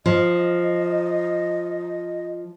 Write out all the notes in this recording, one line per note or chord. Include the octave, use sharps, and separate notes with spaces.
F3 D#5